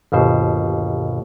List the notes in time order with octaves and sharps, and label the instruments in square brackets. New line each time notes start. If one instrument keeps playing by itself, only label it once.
[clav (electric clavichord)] G1 D#2 B2 C5